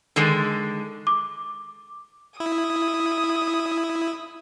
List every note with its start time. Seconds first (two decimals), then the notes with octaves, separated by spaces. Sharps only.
0.16 D3 D#3 G#3
1.07 D6
2.40 E4 D#6